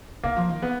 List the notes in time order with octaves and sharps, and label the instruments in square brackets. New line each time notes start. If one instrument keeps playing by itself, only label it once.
[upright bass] D#3 [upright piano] A#3
[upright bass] F3
D#3
[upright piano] B3